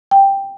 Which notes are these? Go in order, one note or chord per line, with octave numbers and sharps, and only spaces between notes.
G5